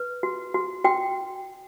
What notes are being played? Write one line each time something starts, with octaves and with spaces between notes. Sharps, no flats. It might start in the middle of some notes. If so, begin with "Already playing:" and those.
Already playing: B4
F#4
F#4
F#4 G5